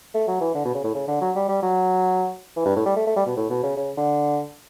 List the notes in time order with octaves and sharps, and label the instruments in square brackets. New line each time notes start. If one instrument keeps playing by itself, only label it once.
[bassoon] A3
F#3
E3
D3
B2
C#3
A2
C#3
D3
F#3
G3
G3
F#3
E3
G2
A2
G3
A3
A3
G3
B2
A2
B2
C#3
C#3
D3